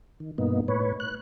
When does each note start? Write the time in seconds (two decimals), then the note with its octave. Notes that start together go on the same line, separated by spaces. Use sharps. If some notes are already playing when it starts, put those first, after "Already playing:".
0.20 D#3
0.38 G2 B2 A#3 B3 D#4
0.68 A2 B4 C#5
1.00 F#6